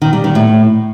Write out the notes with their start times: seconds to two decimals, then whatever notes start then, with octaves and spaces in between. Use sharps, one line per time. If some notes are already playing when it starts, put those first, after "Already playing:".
0.02 D#3
0.13 G3
0.24 D#3
0.35 A2